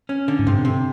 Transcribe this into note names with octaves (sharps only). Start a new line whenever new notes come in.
C#4
D3
G#2
G2 C3
C3